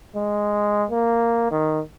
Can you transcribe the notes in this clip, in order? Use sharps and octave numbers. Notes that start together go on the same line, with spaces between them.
G#3
A#3
D#3